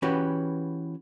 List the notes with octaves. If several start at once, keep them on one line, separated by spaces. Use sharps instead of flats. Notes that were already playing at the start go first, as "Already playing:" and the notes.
E3 C#4 F#4 G4 B4